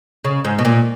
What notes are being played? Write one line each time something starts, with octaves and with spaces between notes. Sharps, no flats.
C#3
G#2
B2
A#2